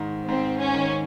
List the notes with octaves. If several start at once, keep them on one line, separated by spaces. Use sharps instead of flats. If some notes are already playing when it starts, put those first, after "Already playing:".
Already playing: G#2 D#3
G#2 C4
C#4
D#3